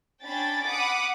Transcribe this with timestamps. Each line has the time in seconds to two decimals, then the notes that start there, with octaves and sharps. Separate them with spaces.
0.24 C#4 D4 G5 B5 A6
0.66 F#5 B5 D6 D#6